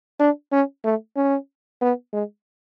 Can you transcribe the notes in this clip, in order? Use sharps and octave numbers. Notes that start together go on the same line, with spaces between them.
D4
C#4
A3
C#4
B3
G#3